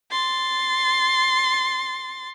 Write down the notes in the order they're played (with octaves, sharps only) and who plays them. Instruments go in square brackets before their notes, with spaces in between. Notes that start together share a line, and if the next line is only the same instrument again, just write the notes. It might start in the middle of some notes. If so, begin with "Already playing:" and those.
[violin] C6 A6